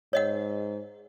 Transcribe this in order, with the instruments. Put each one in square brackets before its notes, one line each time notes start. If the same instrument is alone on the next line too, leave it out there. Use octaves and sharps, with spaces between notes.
[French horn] G#2 [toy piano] C#5 D#5 F#5